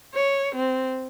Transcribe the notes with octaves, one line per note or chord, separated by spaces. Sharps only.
C#5
C4